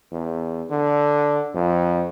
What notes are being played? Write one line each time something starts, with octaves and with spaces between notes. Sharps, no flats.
E2
D3
F2